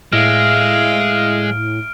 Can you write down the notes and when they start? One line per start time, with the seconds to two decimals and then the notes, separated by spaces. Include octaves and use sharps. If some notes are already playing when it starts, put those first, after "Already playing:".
0.13 A2 G#3 E5 F5 F6 D7